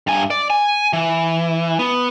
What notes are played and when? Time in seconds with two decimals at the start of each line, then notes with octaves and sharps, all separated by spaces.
0.07 G2 G#5
0.30 D5
0.50 G#5
0.93 E3
1.79 B3